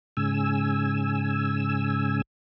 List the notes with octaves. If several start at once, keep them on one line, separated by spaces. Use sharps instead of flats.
G#2 C#3 G#5 E6